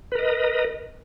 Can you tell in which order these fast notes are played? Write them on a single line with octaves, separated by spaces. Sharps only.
B4 A#4 D#5